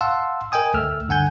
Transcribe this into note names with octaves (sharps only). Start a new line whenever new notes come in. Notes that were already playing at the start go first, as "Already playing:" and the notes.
F5 F#5 A5 C6 E6
A#4 D#5 G5 G#5 D#6
D2 A3 E6 F6
G2 D3 F#5 G#5 G6